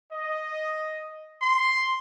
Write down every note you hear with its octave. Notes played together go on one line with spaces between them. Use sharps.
D#5
C6